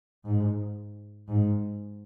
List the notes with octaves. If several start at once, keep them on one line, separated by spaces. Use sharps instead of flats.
G#2
G#2